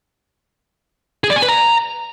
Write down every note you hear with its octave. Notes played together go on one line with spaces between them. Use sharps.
G#4
D5
G#5
B4
A#5